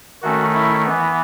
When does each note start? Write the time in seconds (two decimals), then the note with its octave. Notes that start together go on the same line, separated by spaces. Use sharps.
0.22 D#3 A3 C#4 F#4
0.54 E4
0.86 E3 B3